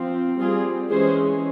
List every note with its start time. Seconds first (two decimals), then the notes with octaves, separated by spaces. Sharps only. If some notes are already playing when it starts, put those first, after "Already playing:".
Already playing: F3 C4
0.39 G3 C4 F4 G#4
0.89 E3 G#3 C#4 G#4 C5